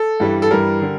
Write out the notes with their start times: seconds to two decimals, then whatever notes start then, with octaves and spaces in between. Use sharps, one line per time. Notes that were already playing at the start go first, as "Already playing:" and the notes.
Already playing: A4
0.20 G2 E3 G3
0.42 A4
0.51 G2 E3 G3 A#4
0.82 D3 G3